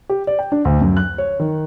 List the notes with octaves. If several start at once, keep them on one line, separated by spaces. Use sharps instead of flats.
G4
D5
G5
D4
D2
F#2
F#6
C#5
D#3